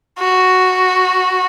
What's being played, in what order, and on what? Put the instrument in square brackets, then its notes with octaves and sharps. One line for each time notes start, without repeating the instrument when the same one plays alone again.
[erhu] F#4